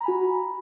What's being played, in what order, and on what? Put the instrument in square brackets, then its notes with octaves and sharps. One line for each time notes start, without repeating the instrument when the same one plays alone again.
[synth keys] A#5
B5
G#5
F#4